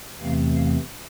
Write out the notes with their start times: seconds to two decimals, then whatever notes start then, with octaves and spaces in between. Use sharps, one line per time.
0.19 E2 C3 E3 A3 C4 F5
0.55 F5